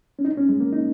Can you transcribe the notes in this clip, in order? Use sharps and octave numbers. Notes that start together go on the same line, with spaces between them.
C#4
D#4
C#4
G#3
A#3
D#4